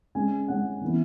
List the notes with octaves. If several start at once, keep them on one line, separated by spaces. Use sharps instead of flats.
C#3 G#3 C#4 G#5
C#3 G#3 C#4 F#5
C#3 E3 B3 E4